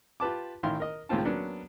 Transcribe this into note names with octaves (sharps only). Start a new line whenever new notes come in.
F4 G4 B4 A5 D6
A1 D#3 E4 F5 C6
A#4 D#5
C#2 A2 D#3 C4 F4 A5
F#3 A#3 B3 C#4 D4